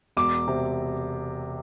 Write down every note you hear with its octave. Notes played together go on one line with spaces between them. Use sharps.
E1 D6
C3